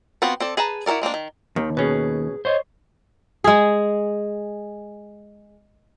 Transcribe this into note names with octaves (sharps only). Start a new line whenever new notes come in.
B3 C4 F4 F#4 B4
C4 A4 D5
G#4 B4 A5 A#5
E4 F#4 A4 A#4 D5
G#3 A#3 C4 D4
D#3
D#2 D#3
B2 C#4 G#4 B4
C5 C#5 D#5
G#3 G#4